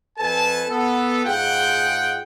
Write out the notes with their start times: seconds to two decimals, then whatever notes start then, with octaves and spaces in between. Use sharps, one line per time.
0.19 F2 A4 B4 G#5 A5
0.70 B3 A4
1.25 G#2 F4 G#4 F#5 G5